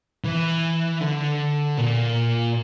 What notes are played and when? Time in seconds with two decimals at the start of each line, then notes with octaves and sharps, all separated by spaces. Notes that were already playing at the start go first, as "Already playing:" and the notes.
0.24 E3
1.01 D3
1.78 A#2